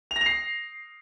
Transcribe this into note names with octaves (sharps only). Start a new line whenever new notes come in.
F7
A#6
F7
C7